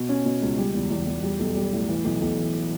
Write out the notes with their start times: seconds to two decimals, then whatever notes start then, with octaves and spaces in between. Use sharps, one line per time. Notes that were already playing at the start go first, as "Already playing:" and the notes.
Already playing: B2
0.09 C#4
0.25 B2
0.41 C#2
0.58 G3
0.74 E2
0.90 E2
1.06 E2
1.23 G3
1.39 B1
1.56 G3
1.73 A2
1.89 E3
2.05 B1
2.21 B1
2.38 E3